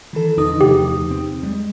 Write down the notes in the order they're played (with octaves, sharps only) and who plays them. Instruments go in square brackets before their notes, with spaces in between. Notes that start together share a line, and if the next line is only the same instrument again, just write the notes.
[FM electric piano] D#3 E3 A4
[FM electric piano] E2 D#4 D#6 [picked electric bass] D3 F3 D4
[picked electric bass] D2 C3 F3 [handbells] G4
[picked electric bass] C4
G3 G#3